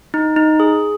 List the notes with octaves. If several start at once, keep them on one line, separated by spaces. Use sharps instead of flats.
D#4
D#4
G#4